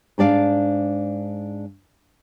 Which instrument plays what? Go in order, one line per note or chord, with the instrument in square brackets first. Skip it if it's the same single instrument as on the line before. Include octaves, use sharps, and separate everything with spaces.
[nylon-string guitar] G#2 D4 D5 F5